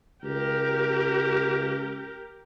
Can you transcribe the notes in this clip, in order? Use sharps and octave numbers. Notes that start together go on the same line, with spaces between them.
C#2 G4 A#4